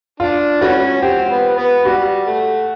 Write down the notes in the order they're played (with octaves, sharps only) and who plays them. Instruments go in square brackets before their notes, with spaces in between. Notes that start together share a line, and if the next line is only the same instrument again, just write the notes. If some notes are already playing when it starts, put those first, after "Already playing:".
[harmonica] D4 [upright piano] F4
[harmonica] E3 A3 C#4 [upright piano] F#4
[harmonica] C4 [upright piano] G4
[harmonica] B3
B3
[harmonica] G3 [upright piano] F#4
[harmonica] A3